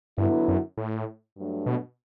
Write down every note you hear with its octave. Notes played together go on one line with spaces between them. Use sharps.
G2 D3 F#3 B3 E4
F#2
A2
G2 F#3 A3 D4
B2